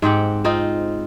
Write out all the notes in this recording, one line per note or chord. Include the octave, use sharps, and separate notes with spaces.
G#2 C4 G4 F#5
C4 D#4 F4